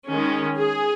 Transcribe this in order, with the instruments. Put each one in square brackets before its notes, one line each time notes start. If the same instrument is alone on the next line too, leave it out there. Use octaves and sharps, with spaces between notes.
[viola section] D#3 G#3 C#4
G#4